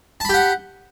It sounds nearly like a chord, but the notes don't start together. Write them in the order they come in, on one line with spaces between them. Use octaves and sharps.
A5 B5 G4 F#5